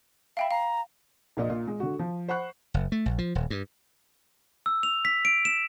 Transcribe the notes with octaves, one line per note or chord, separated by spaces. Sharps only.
E5 F5 G5 B5
F5 A#5
A#1 A#2 D5 D#5
A#2 F4
G#3
D3 F#4
F3
C5 F#5 B5 C#6 F#6
F#1
A3
A#1
F3
D#1
G2
E6
F7
B6
D7
E7